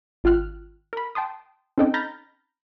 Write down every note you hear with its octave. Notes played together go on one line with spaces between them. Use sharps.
G#1 F4 G5 F6 F#6
A#4 B5
G5 A5 C6 D#6
C4 C#4 D#4 A4 D#5 G5
A#5 B5 F6 G6 A6 A#6